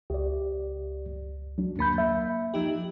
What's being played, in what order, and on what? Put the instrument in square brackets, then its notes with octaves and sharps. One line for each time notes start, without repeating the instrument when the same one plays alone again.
[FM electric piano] C#2 [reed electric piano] G4 D5
[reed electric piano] F#3 D4
[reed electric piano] D2 B5 G6 [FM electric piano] A#3
[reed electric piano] E5
[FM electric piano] F3 D#4 G4